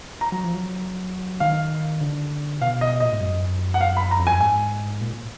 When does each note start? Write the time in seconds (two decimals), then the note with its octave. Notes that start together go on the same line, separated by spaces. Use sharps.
0.21 A#5
0.32 F#3
0.44 F3
0.55 F#3
1.40 D#3 F5
2.01 D3
2.61 B2 F5
2.81 D#5
3.00 A#2 D#5
3.12 G#2
3.20 F#2
3.74 F#5
3.81 F5
3.97 B5
4.11 A#5
4.19 F2
4.27 G#5
4.30 F#2
4.40 G#2 G#5
5.01 A#2